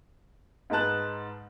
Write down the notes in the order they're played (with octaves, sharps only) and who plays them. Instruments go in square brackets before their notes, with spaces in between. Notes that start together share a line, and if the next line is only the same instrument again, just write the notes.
[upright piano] G#2 D#4 B4 A5 F#6